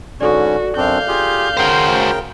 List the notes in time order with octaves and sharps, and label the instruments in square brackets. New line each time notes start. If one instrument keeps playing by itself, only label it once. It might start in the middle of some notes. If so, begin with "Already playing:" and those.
[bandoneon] G#2 D3 C#4 [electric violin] F#4 [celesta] A4 D5
[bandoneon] F#2 C4 D4 [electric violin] F5 G6
[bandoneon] F4 G4 G#4
[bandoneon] C#3 A#4 G5 [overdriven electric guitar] F#4 C5